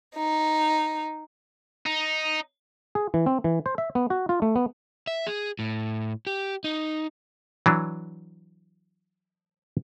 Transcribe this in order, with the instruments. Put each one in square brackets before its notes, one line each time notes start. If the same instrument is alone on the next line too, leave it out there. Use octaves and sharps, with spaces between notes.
[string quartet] D#4
[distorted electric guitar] D#4
[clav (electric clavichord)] G#4
E3
C4
E3
C5
E5
B3
F#4
F4
A3
B3
[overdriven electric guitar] E5
G#4
A2
G4
D#4
[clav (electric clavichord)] E3 F#3 D4